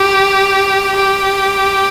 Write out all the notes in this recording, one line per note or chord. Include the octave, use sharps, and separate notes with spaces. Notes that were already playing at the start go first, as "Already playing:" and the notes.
Already playing: G4
G4